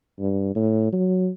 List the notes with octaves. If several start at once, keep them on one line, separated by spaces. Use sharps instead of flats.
G2
A2
F#3